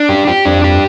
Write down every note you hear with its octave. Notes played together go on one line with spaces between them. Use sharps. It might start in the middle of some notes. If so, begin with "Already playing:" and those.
Already playing: D4
F#2 G4
F2 G4
F2 D4
G4